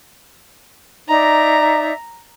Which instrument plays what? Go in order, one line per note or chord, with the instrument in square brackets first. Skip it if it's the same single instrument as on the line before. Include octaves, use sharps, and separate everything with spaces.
[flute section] D#4 D5 E5 [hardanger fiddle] A#5